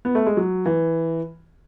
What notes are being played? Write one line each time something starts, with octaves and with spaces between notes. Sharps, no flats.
B3
A3
G#3
F#3
E3